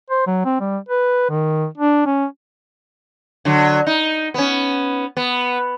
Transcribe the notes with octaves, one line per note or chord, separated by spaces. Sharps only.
C5
F#3
C4
G3
B4
D#3
D4
C#4
D3 F#3
D#4
B3 C#4
B3